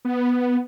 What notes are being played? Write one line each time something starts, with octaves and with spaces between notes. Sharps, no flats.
B3